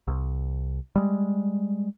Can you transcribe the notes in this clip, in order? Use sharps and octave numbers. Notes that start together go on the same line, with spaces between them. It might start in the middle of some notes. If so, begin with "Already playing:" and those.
C2
G3 G#3